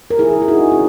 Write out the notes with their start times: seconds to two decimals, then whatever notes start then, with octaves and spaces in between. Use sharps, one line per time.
0.10 A#4
0.19 E4 G#4
0.42 G#4
0.48 D#4 F#4
0.72 C#4